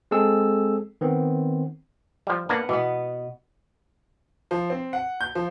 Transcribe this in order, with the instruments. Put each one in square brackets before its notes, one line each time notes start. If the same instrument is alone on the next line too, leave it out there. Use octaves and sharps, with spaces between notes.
[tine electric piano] G#3 C4 G#4 A4 E6
D#3 B3 C4
[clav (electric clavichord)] F3 G3
[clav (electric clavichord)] A#3 D4 [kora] B3 F#5
[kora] B2 B3 [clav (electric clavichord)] E3
[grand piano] F3
C4
F#5
G6
F3